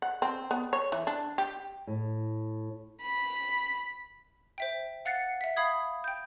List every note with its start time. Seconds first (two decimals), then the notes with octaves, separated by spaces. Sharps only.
0.02 F#5
0.22 C4
0.51 B3
0.73 C#5
0.92 E3
1.07 D4
1.38 G4
1.87 A2
3.01 B5
4.58 C5 E5 G5
5.05 F5 F#5 F#6 A6 C7 C#7
5.41 E5 B6
5.56 F5 B5 D#6 G#6
6.04 G5 G6